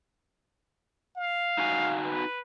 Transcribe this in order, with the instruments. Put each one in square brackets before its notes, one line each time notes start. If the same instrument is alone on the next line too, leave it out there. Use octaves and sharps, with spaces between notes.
[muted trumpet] F5
[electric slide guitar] D#4 F#4 G#5
[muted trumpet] B4